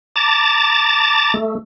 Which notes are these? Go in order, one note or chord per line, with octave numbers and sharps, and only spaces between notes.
A5 A#5 D6 A6
A3